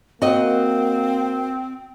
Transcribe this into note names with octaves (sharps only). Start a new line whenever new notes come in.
A#3 C4 F#4 D#5